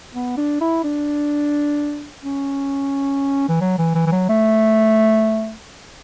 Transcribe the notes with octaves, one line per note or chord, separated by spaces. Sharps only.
B3
D4
E4
D4
C#4
E3
F#3
E3
E3
E3
F#3
A3